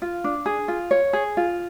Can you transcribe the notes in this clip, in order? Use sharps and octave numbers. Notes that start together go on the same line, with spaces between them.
F4
D4
G#4
F4
C#5
G#4
F4